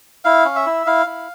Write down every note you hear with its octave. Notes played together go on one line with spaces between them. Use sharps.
E4 F5
C#4
E5
E4
E4 F5
E4